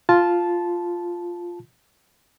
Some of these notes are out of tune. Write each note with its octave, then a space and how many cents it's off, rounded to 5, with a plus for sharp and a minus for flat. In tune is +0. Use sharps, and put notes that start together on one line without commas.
F4 +0 A5 -10